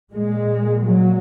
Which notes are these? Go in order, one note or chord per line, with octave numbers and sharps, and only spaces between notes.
A#2 G#3
F#3